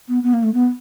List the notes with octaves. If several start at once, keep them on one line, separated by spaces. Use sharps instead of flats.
B3
B3
A#3
A3
B3